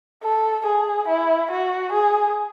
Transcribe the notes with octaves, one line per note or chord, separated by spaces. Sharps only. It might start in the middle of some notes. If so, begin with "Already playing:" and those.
A4
G#4
E4
F#4
G#4